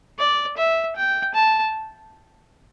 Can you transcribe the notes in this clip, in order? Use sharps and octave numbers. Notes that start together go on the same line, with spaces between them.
D5
E5
G5
A5